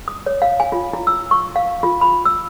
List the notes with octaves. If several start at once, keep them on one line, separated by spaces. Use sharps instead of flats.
D#6
C#5
F5
G#5
F4
E4
E6
C#6
F5
F4
B5
E6